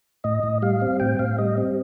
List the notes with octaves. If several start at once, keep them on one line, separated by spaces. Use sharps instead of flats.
A2 D#5
A2
G3 F5
C4
A2 G5
A2 F5
G3 D#5
C4